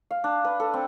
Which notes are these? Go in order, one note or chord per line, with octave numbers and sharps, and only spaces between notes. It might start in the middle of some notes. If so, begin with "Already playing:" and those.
F5
D4
B4
A4
C4